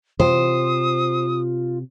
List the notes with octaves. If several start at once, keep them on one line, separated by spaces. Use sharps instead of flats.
C3 F4 C5 D#6